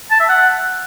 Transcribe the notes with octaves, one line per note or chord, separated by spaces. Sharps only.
A5
E5
F#5